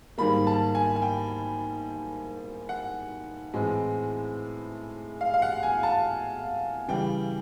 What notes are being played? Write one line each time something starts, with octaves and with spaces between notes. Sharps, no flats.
G#2 D#3 G3 A#3 B5
A5
G#5
G#5
G5
F#5
A2 E3 G#3 C4
F5
F5
F#5
G#5
A5
C#3 E3 G3 G5